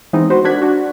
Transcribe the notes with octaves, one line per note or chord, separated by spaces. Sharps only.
E3 G#3 B3 C4 D#4
F#4 B4 C5
D4 F#4 A#4 F#6 G#6 B6
D4 F#4